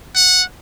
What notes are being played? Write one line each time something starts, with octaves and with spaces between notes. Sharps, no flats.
F#5